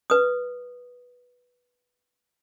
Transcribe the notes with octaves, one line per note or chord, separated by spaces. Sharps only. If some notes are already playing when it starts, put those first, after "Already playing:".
B4 D#6